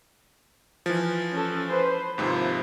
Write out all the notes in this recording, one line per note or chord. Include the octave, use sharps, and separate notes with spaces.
E3 F3
C#4 A4
B4 C5
D#2 G#2 C3 F3 E4